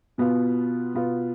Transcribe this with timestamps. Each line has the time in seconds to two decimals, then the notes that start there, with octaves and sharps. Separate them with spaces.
0.18 B2 B3 F4
0.94 B2 B3 F4